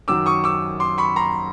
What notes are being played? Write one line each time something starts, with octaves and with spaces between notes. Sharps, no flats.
F#2 D#3 F#3 D6 E6
C#6 D#6
D6 E6
C6 D6
B5 C#6
A#5 C6